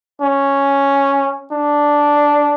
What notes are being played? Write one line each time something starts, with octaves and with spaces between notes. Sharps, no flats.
C#4
D4